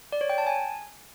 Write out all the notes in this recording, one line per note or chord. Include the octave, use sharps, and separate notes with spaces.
D5
C#5
G5
A5
G#5